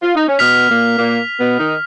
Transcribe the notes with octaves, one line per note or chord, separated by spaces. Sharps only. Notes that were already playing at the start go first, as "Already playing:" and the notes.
F4
D#4
C#4
B2 B3 F6 B6 F7
A#2 A#3
A#2 A#3
B2 B3
D#3 D#4